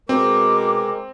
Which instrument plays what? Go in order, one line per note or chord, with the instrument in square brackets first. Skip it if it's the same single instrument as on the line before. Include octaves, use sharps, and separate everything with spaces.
[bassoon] B2 [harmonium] G#3 A#4 [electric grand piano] C4 [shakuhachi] D6